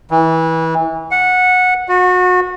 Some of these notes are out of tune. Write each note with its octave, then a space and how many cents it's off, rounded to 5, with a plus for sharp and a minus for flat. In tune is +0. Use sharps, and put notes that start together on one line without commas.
E3 -25
F#5 -15
F#4 -30